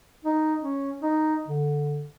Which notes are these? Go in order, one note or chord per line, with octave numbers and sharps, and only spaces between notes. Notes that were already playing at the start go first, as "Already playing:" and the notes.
D#4
C#4
D#4
D3